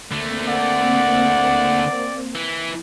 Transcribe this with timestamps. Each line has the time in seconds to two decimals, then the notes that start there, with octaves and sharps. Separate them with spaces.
0.12 D3 A3 A#3 C4
0.48 D5 F#5
2.35 E3